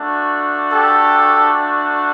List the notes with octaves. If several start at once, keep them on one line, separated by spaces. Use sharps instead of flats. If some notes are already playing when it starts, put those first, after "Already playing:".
Already playing: A3 D4 F#4
G4 A4